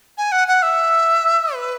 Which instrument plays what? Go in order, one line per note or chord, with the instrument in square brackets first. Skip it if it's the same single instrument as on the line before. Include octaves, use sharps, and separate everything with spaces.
[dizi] G#5
F#5
F#5
E5
B4